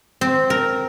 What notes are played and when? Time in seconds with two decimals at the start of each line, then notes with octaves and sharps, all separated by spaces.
0.21 C4
0.50 A#4